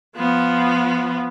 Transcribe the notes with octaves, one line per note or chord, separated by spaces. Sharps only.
F3 B3